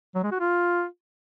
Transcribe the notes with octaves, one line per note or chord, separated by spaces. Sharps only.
F#3
G#3
F#4
F4